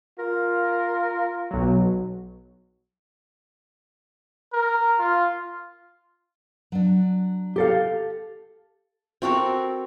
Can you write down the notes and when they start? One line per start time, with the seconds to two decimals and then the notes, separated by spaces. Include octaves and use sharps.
0.19 F4 A#4
1.51 B1 F#3
4.53 A#4
4.99 F4
6.72 F#3 D4
7.56 G4 A4 F5
9.22 C4 F#4 A4 A#4